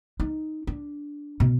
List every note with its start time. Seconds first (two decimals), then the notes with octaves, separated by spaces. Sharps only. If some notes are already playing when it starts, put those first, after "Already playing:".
0.20 D#4
0.67 D4
1.40 B2